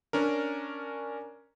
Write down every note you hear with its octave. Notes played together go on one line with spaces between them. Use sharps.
C#4 D4 A#4